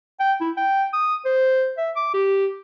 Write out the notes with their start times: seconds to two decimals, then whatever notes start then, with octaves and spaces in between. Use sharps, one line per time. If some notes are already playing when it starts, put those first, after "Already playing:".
0.20 G5
0.41 E4
0.57 G5
0.93 D#6
1.25 C5
1.78 E5
1.96 D6
2.14 G4